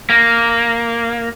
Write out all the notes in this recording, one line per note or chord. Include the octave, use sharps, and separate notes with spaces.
A#3